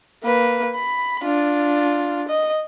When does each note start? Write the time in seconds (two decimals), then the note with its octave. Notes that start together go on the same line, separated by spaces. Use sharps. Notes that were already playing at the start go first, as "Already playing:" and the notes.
0.23 A#3 B4
0.75 B5
1.23 D4 F4
2.28 D#5